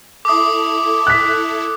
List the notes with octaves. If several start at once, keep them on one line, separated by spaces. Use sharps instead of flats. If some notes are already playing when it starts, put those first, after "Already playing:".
E4 A4 D6 D#6
F#6 B6